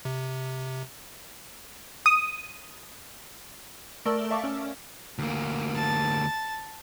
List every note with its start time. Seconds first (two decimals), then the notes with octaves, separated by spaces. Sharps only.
0.05 C3
2.06 D#6
4.06 A3 A#4 D5 A5 E6 G7
4.30 D5 E5 F5 A5 C#6 D6
4.44 C#4
5.18 D2 A#3
5.75 A5